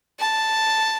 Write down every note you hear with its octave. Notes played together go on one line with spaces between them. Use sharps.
A5